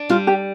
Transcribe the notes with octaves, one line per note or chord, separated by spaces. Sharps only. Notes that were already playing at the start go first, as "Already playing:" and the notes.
Already playing: D4
G3 F4
G4